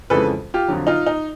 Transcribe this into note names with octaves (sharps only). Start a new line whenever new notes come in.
F2 C#3 E3 G#3 A4 B4
F4 G4
F2 D3 F#3
D#4 F4
D#4